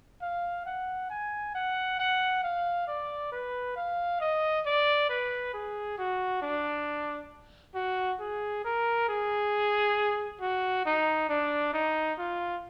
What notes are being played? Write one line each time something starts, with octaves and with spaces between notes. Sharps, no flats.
F5
F#5
G#5
F#5
F#5
F5
D5
B4
F5
D#5
D5
B4
G#4
F#4
D4
F#4
G#4
A#4
G#4
F#4
D#4
D4
D#4
F4